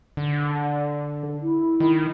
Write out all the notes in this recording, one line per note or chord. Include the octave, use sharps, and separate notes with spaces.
D3
E4
D#3